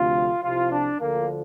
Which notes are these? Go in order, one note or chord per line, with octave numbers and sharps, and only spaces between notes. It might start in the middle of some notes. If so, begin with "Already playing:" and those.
Already playing: D2 C3 F3 F4
C2 C3 F3 F4
D4
D2 D3 F3 A#3